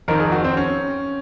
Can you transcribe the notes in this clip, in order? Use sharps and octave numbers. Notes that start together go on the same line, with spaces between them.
F2 D#3 A#4
G#4
F#4
C4
C#4